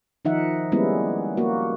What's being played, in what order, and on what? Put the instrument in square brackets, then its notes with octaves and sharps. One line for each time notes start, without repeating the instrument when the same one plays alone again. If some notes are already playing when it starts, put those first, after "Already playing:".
[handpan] D#3 F3 D#4 E5 F#5
G3 G#3 A#3 B3 C#4 E4
A#3 F#4